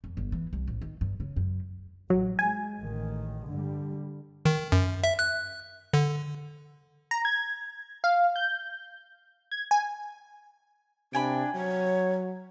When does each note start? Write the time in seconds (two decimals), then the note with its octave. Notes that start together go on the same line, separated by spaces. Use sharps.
0.04 F2
0.17 G1
0.32 E3
0.53 C2
0.68 A1
0.82 D#3
1.01 G2
1.20 C#3
1.36 F#2
2.10 A1 F#3
2.39 G#3 G#5
2.78 A1 D#3
3.49 G2 D3 G3
4.45 D#3
4.72 F#2
5.04 E5
5.19 F#6
5.93 D3
7.11 A#5
7.25 G#6
8.04 F5
8.36 G6
9.51 G#6
9.71 G#5
11.13 C3 D4 G5 G#5 B5
11.55 F#3 C#5